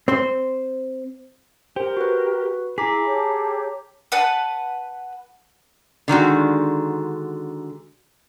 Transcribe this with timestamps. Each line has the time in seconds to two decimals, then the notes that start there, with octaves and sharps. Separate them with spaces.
0.08 C4 C5
1.76 G4 A#4 C5
1.97 F#4 B4
2.78 E4 G#4 A#5 D6 B6
3.06 G4 A4 C#5
4.12 B4 F#5 A5
6.08 D3 D#3 G#3 F#4